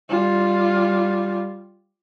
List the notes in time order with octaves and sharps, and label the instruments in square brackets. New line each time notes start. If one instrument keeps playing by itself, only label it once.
[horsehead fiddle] G3 F4